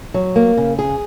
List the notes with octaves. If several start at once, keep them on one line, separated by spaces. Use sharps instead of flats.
F#3
A#3
C#3
G#4